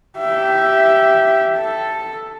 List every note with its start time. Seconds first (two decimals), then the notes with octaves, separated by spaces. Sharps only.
0.19 G4 E5
1.57 A4